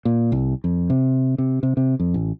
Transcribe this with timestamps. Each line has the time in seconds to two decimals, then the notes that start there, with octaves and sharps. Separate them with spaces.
0.05 A#2
0.32 C2
0.64 F2
0.90 C3
1.38 C3
1.63 C3
1.77 C3
2.00 F2
2.14 A1